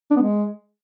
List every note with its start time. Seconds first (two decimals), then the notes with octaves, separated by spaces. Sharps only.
0.11 D4
0.16 B3
0.22 G#3